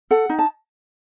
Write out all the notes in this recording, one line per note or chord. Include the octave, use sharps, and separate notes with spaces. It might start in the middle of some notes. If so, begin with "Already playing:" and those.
A4 F#5
D#4
A5